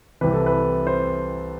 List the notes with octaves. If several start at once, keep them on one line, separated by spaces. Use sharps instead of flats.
C2 C3 E3 B4
A4
B4
C5